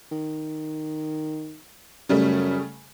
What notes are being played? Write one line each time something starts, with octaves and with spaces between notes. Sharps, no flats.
D#3
F#2 C#3 G3 A3